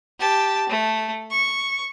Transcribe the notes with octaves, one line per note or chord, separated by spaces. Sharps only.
G4 A5
A3
C#6